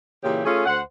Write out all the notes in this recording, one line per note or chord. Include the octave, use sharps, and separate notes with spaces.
A#2 C#3 E3 G4
A3 C#4 F4 G#4 A4
D2 C5 F#5